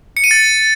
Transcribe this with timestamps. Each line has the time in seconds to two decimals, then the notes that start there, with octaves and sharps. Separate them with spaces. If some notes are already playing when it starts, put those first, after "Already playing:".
0.17 C#7
0.24 D#7
0.31 A6